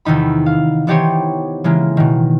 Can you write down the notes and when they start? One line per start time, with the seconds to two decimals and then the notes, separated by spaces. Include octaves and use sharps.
0.05 E2 C3 D#3 D#4 B5
0.46 F5
0.87 E3 B3 D#4 G4 C5 C#5
1.64 C#3 E3 G#3 A#3
1.97 B2 D#3